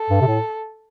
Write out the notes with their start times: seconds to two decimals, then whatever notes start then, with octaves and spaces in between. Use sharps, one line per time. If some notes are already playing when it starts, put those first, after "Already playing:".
Already playing: A4
0.10 G2
0.21 C3
0.27 A2